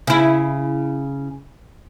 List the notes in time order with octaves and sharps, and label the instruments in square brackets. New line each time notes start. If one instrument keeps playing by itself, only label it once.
[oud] C#3 E4